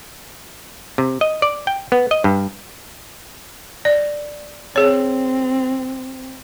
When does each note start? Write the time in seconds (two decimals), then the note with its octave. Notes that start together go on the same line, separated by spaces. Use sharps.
0.98 C3
1.21 D#5
1.42 D5
1.67 G5
1.92 B3
2.11 D#5
2.24 G2
3.85 D5
4.76 C4 G#4 C#5